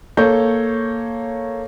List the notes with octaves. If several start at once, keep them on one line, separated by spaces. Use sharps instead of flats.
A#3 A4 C#5 G6